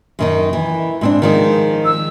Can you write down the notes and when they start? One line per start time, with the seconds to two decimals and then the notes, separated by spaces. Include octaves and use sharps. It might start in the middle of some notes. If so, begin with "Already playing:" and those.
0.19 F#2 D#3 D#4
0.53 E3
1.01 G#2 C4 D4
1.22 D#3 F3 G#3
1.85 E6